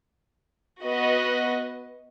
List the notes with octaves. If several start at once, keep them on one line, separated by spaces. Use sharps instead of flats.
B3 F#4 B4 D#5